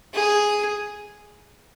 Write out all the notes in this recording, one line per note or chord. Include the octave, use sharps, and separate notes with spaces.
G#4